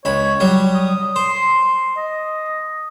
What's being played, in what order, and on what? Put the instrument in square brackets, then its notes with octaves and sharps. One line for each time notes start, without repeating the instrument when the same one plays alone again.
[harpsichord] C#2 B5 [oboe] C#5
[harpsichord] F#3 G3
[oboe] D#6
[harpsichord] C5 [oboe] C6
[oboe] D#5